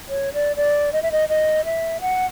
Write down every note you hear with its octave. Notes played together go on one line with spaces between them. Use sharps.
C#5
D5
D5
D#5
E5
D#5
D#5
E5
F#5